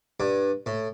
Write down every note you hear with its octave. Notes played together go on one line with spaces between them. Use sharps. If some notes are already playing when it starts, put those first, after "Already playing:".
G2
A2